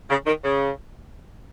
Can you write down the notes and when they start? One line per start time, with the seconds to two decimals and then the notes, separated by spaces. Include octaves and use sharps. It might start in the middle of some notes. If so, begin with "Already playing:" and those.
0.09 C#3
0.26 D#3
0.44 C#3